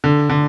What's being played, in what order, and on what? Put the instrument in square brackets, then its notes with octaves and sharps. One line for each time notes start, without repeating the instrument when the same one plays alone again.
[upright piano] D3
D3